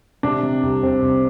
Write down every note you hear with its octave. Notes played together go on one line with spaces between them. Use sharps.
C3 D4
C3
C2
C2 C4
C2